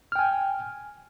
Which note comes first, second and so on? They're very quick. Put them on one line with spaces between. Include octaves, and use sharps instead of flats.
F6 G5 G#5